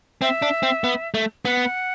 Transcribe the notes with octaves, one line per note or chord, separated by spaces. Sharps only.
C4 E5
D4
C4
B3
A3
B3 F#5